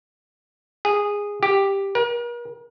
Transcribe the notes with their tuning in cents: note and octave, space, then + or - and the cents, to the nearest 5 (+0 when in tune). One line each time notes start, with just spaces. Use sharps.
G#4 -15
G4 +5
A#4 +45